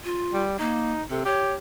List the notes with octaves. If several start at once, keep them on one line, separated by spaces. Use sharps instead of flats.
F4
G3
A#3 D#4
C3 A4
G4 C#5